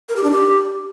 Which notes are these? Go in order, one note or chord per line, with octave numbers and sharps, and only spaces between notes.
A#4
G4
D4
G4